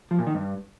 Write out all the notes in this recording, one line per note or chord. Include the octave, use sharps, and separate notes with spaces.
F3
A#2
D#3
G2